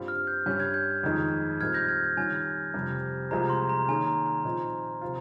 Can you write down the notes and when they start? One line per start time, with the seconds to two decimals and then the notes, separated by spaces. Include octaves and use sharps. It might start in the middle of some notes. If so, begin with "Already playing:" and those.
Already playing: G2 G3 C4 F4
0.08 F6
0.27 G6
0.46 G2 G3 C#4 G6
0.60 G#6
0.74 G6
1.03 F2 D#3 G#3 D#4
1.60 A#2 G3 C4 D#4 A#4 F6 G#6
1.74 G6 A#6
1.88 F6 G#6
2.04 G6
2.17 D#3 G3 C#4 F4 G#5
2.74 F2 C3 G3 C4
3.31 C2 C3 F3 G#3 C4 A#5
3.50 C6
3.69 A#5
3.88 D#3 A#3 C#4 G#4 G#5
4.07 A#5
4.26 A#5
4.45 A#2 F3 C4 D#4
5.02 C3 F3 C4 F4